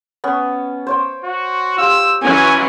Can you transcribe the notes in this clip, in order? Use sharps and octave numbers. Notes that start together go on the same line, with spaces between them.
B3 C#4
C5 C#5 G5
F#4
F4 G4 E6
E3 F#3 C#4 G#5